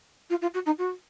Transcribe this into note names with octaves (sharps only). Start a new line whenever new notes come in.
F4
F4
F#4
D#4
F#4